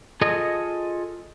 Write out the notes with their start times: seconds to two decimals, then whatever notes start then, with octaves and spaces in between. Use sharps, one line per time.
0.21 F4 G#4 A4 D#5